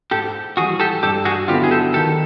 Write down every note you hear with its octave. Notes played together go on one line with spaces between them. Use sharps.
G#2 G4 A4
E3 G3 F#4 G#4
G4 A4
G2 G4 A4
F#4 G#4
D3 F#3 B3 E4 F4 G4
G#4
G4 A4
D#3 G4 A4